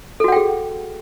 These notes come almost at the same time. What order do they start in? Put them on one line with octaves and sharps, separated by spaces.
A4 F#4 F#5 G5 G#4